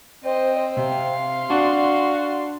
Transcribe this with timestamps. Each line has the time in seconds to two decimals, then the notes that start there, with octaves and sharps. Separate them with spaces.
0.24 C4 C5 D#5
0.77 C3 F5 C6
1.50 D4 F#4